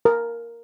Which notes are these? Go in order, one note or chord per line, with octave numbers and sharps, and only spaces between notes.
A#4